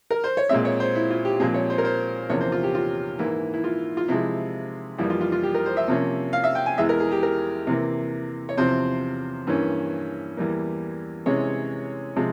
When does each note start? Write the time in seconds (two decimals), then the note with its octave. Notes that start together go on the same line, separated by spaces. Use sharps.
0.10 A#4
0.24 C5
0.37 C#5
0.49 A#2 G#3 C4 E5
0.65 C#5
0.80 C5
0.95 E4
1.10 F4
1.25 G4
1.40 A#2 F3 G#3 C4 G#4
1.54 C#5
1.70 C5
1.78 A#4
1.84 C5
2.30 E2 C3 F3 A#3 C#4 C#5
2.40 C5
2.52 F4
2.63 G4
2.75 F4
3.19 G#2 E3 A#3 E4
3.54 E4
3.64 F4
3.97 F4
4.08 C3 F3 G#3 E4
4.98 F2 E3 G3 A#3 E4
5.10 F4
5.21 F4
5.32 F4
5.43 G4
5.54 A#4
5.66 C5
5.77 E5
5.88 C3 F3 A#3 C#4
6.33 F5
6.44 E5
6.55 G5
6.66 G#5
6.78 E2 E3 G#3 E5
6.89 A#4
7.00 G#4
7.12 G4
7.23 A#4
7.67 C3 E3 A#3
8.49 C#5
8.58 E2 C3 F3 C4 C5
9.47 G2 E3 A#3 C#4
10.37 E2 E3 G3 A#3
11.26 C3 E3 G#3 C#4 C#5
12.16 C3 F3 G#3